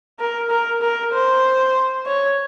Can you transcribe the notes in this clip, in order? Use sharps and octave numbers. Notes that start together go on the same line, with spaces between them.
A#4
A#4
A#4
C5
C#5